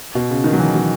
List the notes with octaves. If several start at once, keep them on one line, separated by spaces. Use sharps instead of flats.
B2
C#3
D#3
F#3
E3
F#3